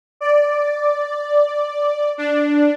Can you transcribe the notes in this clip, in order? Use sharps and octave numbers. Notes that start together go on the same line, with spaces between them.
D5
D4